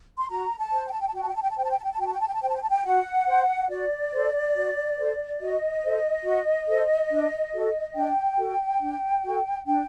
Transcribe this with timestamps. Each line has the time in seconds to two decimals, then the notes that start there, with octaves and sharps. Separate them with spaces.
0.18 C6
0.29 F#4 A#5
0.57 A5
0.72 C5
0.86 G5
0.93 A5
1.00 G5
1.07 A5
1.14 F#4 G5
1.22 A5
1.28 G5
1.35 A5
1.42 G5
1.49 A5
1.57 C5 G5
1.64 A5
1.70 G5
1.78 A5
1.84 G5
1.91 A5
1.99 F#4 G5
2.05 A5
2.13 G5
2.20 A5
2.27 G5
2.34 A5
2.41 C5 G5
2.48 A5
2.55 G5
2.62 A5
2.69 G5
2.85 F#4 F#5
3.27 C5
3.69 F#4 D5
4.13 A4 C5
4.55 F#4
4.98 A4 C5
5.40 F#4 D#5
5.83 A4 C5
6.25 F#4
6.67 A4 C5
7.11 D4
7.54 F#4 A4
7.95 D4 G5
8.38 F#4 A4
8.81 D4
9.24 F#4 A4
9.66 D4 G5